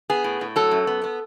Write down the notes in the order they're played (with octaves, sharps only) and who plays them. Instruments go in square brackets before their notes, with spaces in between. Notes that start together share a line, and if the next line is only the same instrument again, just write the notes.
[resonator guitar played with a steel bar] B3 G#4
A2
A2
F#3 A4
F#2
B3
B3